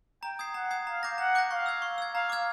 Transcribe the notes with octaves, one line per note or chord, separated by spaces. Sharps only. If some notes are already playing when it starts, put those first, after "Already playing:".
G5 A#5
D#6 G#6 C7
F#5 A#5
D#6 G#6 C7
F5 A#5
D6 G6 A#6
F#5 A#5
D6 G6 A#6
F5 C#6
E6 G#6
C#6
E6 G#6
F5 A#5
D6 F6 G#6